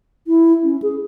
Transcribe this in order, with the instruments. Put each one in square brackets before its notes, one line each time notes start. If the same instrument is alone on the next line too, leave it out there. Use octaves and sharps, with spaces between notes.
[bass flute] E4
C#4
G#4